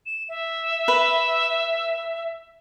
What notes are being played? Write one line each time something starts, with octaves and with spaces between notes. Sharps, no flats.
E7
E5
B4